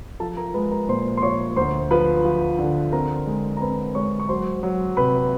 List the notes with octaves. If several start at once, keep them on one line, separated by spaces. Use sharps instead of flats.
F3 A4 A5
A#4 A#5
G#3 B4 B5
A#4 A#5
A#2 C5 C6
C6
F3 C#5 C#6
D2 C5 C6
F3 B4 B5
F3
D3
C4 A#4 A#5
G#3
A#5
C4 B4 B5
G#3 C#5 C#6
C#6
F#3 C5 C6
F#3
C3 B4 B5